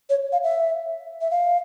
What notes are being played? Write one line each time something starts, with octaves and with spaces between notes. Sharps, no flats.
C#5
F5
E5
E5
F5